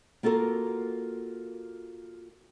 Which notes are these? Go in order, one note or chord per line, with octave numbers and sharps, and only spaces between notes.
A#3 F4 F#4 A4 A#4